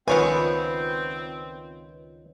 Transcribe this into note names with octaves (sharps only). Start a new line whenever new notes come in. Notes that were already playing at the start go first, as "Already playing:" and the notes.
C#2 D#3 F3 B3 C4 B4 C#5 G#5